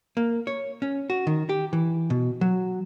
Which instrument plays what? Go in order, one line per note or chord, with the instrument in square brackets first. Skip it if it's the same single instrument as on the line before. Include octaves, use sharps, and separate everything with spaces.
[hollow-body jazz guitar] A#3
C#5
C#4
F#4
D#3
G4
E3
B2
F#3